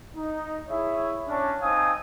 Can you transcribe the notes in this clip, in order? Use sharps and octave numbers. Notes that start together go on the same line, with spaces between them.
D#4
E4 G#4 C#5 E5
C#4 D4
C4 D#4 F5 G#5 A5 D#6